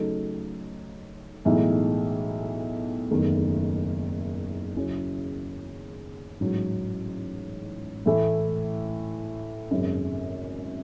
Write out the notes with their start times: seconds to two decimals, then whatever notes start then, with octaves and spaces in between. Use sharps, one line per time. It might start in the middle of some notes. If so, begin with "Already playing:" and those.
Already playing: C#3 F#3 A3 D#4 A4
1.45 B1 A2 E3 G#3 D#4
3.11 F#1 E2 D#3 A3
4.75 C#3 F#3 C#4 E4 G#4
6.40 A1 G#2 F#3
8.06 A2 E3 A3 E4
9.70 G#1 F#2 C#3